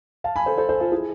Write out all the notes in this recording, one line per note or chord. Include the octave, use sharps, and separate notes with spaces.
F5 A5
G#5 B5
A4 C5
A4 C5
A4 C5
F4 A4
E4 G#4